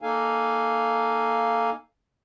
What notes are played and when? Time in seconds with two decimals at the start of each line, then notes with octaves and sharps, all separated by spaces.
0.02 A#3 D#4 A4 F5 G#5